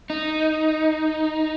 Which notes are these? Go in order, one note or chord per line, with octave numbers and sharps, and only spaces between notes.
D#4